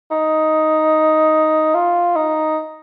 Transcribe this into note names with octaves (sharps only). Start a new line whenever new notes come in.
D#4
F4
D#4